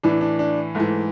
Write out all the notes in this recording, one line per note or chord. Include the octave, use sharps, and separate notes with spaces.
A2 E3 D4
D4
D4
G#2 E3 A3